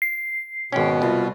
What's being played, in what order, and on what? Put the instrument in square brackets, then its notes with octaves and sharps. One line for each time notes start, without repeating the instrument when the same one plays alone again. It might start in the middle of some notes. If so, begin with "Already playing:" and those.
[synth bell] C7
[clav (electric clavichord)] G#1 C#4 [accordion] B2 [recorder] G5
[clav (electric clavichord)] C2 [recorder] F4